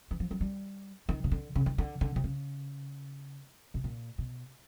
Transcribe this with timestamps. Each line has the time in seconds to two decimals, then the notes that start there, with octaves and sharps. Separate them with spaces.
0.11 E3
0.20 F3
0.31 F#3
0.41 G3
1.09 D#3
1.24 C#3
1.32 D3
1.55 C#3
1.66 D#3
1.78 D3
2.01 D3
2.16 C3
2.24 C#3
3.74 B2
3.84 A#2
4.18 B2